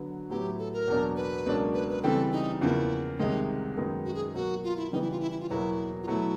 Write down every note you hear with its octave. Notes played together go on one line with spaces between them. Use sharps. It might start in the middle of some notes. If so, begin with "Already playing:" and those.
Already playing: D3 F#3 B3
A2 F#3 B3 E4 G4
A4
A#4
E2 B2 F#3 A#3 D4
B4
C#2 B2 F#3 A#3 D4
B4
B4
C#3 E3 G3 C4 A4
D#4
E2 C#3 F3 A#3 E4
C2 C3 D#3 G#3 D#4
F#2 D#3 G#3 B3 D#4
F#4
G#4
B2 F#3 A#3 F#4
F4
E4
C#3 E3 G3 B3 D#4
E4
F4
E4
E4
F4
E2 B2 F#3 A#3 E4
F4
B2 F#3 A3 E4